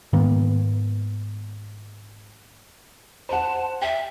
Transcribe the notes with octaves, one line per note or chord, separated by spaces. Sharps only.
G#2 D#3 A#3 B3
C5 F#5 A5
E5 G5